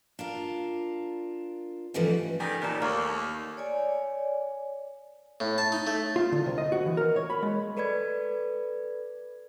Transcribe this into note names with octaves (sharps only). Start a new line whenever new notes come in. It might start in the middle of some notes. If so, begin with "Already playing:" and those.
D4 F4 A#4
G#2 C#3 E3 F3 G3 A3
D#3 G3 G#5
D#2 A#2 D#3 G3 A5
D#2 A3 A#3
C#5 D5 G#5
A2
A5
D#4
A3
F4
D3
C2
D#5
F#4
E3
A#4
C#5
B5
G#3
A4 B4 D5 B5 G#6